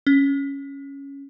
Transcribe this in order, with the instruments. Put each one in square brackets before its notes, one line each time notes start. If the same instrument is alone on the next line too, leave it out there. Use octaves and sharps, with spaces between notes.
[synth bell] C#4